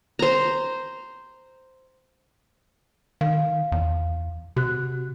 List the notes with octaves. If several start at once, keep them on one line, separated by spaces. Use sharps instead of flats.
C5 A#5
D#3 F5
E2
C3 F#4 F#6